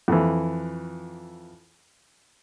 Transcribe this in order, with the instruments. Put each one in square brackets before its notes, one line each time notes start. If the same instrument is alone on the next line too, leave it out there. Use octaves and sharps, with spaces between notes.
[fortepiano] F2 E3